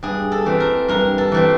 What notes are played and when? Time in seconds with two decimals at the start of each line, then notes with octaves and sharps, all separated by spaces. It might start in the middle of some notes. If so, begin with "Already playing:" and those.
0.03 G2 G#4
0.32 A4
0.46 E3 A3 C4
0.60 A#4
0.88 G2 A#4
1.18 A4
1.32 E3 A3 C4